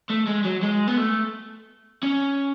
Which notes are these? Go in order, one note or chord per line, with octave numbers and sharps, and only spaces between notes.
A3
G#3
F#3
G#3
B3
A3
C#4